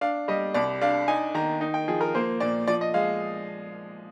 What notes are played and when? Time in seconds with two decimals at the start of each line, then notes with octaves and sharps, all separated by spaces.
0.01 D4 F5
0.28 G3 D#5
0.54 C2 D5
0.81 D4 F5
1.08 D#4 G#5
1.35 D#3 A#5
1.61 D#4
1.74 G5
1.88 F3 G#4
2.01 A#4
2.15 A#3 C5
2.40 A#2 D5
2.68 F3 D5
2.81 D#5
2.94 G#3 F5